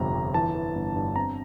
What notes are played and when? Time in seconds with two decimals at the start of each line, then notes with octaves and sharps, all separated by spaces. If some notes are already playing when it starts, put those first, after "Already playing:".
Already playing: G1 F2 C3 A#5
0.14 G1
0.34 E3 A5
0.55 E3
0.75 G1
0.96 G2
1.16 C4 A#5